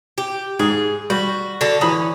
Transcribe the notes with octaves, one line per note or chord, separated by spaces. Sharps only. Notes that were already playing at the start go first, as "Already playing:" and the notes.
G4
G#2 G#4
G3 F#4
D3 F#4 A4
E3 C#4 B5 D#6